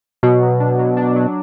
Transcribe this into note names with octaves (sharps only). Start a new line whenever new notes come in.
B2 F#3
F#3
D4
F#3
D4
F#3